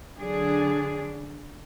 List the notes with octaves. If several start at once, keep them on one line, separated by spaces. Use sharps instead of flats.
D3 F#3 D4 G#4